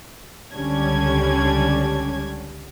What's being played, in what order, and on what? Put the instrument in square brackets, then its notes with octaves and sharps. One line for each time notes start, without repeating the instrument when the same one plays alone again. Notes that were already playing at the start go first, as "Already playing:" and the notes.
[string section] C#2 D3 G3 C#4 D4 G#6